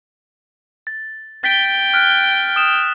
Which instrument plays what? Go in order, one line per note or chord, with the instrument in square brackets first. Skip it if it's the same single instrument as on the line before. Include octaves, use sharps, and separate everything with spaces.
[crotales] A6
[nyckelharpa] G5 [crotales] A6 B6 G7
[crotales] F6 F#6 B6
D#6 E7